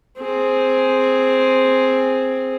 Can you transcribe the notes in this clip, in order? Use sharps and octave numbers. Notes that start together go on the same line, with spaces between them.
C4 G#4